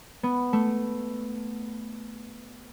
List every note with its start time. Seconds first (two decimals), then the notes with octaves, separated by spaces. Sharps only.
0.23 B3
0.53 A3